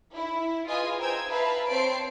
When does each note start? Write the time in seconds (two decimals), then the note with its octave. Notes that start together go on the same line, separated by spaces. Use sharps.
0.15 E4
0.67 F4 G#4 B4 D#5 G#5 D#6
0.99 C5 G5 A#5 E6 G#6
1.30 B4 E5 F5 A5 A#5
1.69 C4 C5 C#5 A5 C7 D7